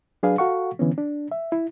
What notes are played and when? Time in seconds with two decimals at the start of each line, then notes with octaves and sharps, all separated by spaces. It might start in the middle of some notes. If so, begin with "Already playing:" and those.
0.23 F#3 D4 G#4 B4 F5
0.38 F#4 A4 F5 F#5 C#6
0.79 D3 E3 B3 C#4
0.98 D4
1.32 E5
1.52 E4